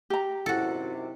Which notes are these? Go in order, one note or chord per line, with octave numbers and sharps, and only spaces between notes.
G4 A#5
G#1 F#2 C3 E4 F#4 A4